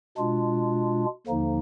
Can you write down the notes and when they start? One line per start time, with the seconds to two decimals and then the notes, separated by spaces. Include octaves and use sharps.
0.17 B2 G#3 D4 F4
1.27 D#2 D3 F3 A#3 D#4